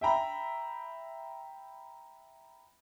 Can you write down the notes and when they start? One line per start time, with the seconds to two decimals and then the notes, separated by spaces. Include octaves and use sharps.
0.01 E5 G5 A#5 B5